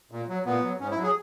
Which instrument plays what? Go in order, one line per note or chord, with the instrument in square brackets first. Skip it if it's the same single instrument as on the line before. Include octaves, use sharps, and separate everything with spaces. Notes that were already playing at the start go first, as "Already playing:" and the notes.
[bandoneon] A#2
F#3
A#2 B3
F#3
G#2 C#4
E4
F#3
G#4